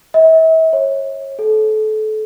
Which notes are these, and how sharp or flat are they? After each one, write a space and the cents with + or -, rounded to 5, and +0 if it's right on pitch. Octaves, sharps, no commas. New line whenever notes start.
E5 -40
C#5 -25
A4 -30